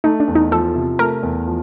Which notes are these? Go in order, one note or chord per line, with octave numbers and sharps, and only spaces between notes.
A3 D#4
D4
E2
D#4
F3 A4
C3
A3 A#4
E2
F3